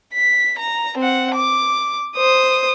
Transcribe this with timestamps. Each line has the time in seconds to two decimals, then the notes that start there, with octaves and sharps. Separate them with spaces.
0.13 B6
0.59 A#5
0.98 C4 F#5
1.35 D6
2.17 C5 D#6